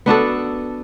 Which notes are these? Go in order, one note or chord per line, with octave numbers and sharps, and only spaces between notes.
B3 D4 F#4 A4